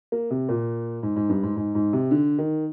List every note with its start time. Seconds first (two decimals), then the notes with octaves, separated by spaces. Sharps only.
0.12 A#3
0.31 C3
0.49 A#2
1.03 G#2
1.16 G#2
1.29 G2
1.43 G#2
1.57 G#2
1.75 G#2
1.93 C3
2.11 D3
2.38 D#3